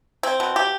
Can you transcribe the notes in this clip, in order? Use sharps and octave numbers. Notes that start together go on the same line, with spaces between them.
C4
B2
G4